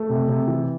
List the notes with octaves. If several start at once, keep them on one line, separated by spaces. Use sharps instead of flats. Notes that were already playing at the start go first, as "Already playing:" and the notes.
Already playing: A3
C3
C3
E3